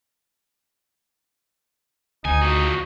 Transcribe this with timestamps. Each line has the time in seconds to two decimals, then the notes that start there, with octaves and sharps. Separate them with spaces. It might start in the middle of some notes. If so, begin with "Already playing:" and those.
2.25 D2 D#4 G#5
2.42 F3 F#4